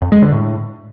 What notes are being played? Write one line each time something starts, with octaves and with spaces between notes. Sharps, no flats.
F2
G#3
D3
A2